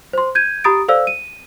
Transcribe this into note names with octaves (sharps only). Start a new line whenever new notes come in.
C5 C6
G6 G#6 D#7
G4 A#5 B5 D#6 A6 D7
A4 C5 D5 F5 E6
D#7